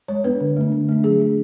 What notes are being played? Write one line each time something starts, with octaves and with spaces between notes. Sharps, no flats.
G#3 C#5
B3 D4 B4
D3
A3 D4
D3
A3 D4
F#3 G#4
A3 D4